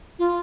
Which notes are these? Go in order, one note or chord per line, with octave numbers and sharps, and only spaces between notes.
F4